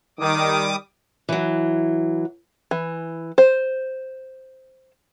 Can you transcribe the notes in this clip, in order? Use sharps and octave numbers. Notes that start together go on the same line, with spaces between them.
D#3 G3 D6 D#6
E3 F#3
E3
C5